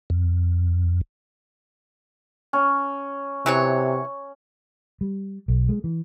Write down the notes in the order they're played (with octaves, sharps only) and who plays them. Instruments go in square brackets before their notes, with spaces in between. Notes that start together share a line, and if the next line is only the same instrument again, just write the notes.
[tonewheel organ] F2
[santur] C#4
[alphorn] C3 [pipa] E3 F#3 C#5
[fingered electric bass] G3
B1
G#3
E3